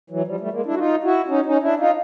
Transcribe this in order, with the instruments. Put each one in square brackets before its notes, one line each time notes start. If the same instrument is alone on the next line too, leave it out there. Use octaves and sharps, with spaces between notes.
[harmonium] E3 F#3
F3 G3
G3 A3
G#3 A#3
D4 E4
F#4
D#4 F4
E4 F#4
C#4 D#4
C#4 D#4
D4 E4
D#4 F4